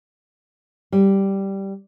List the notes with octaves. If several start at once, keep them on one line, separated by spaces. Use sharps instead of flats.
G3